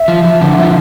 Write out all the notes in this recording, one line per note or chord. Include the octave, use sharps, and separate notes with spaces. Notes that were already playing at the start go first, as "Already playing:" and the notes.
Already playing: E5
F3
F3
D3
F3 E5